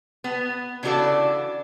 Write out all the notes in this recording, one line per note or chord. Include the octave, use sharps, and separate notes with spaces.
B3
C#3 E3 D4 F#4 A4 D5